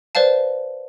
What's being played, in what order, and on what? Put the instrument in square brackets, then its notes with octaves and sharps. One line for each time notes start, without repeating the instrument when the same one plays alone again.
[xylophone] B4 C5 D5 F5 A5